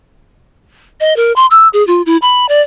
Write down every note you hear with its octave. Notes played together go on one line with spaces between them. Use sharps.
D#5
A#4
C6
E6
G#4
F4
E4
B5
D5